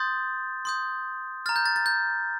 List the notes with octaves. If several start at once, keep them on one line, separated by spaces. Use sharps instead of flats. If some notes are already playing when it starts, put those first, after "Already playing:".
Already playing: C6 D#6 G6 A6
C6 D#6 G6
A#5 F6 A6
G6
A6
A6
G6